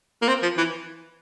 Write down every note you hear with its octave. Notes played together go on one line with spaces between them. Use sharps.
A#3
C4
F3
E3